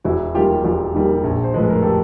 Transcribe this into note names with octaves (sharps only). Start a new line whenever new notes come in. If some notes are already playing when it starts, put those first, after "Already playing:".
E1 E4 F#4
D#2 D#3 G3 A#3 F4 G4
E1 F4 G4
D#2 D#3 G3 A#3
A#1
C5
A2 F3 G#3 B4
A#4
G4 A4